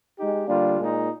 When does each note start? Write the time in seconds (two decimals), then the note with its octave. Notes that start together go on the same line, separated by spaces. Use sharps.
0.16 G#3 D#4 G4
0.46 D3 G3 A#3 D4 F4
0.77 A#2 G#3 D#4